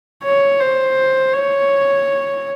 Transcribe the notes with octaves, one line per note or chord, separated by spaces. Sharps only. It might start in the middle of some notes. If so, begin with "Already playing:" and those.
C#5
C5
C#5